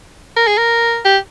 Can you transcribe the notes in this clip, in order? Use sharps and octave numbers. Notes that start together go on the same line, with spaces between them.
A#4
G#4
A#4
G4